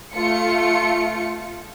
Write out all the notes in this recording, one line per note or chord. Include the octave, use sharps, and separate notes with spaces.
A3 F4 C#7